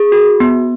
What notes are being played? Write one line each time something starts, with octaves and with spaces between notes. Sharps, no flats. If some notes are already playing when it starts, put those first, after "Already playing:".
Already playing: G#4
F#4
B3